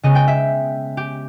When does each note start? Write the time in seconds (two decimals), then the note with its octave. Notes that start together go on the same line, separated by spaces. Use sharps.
0.03 C#3 G#3 B3 D#5
0.15 G5
0.28 E5
0.97 G4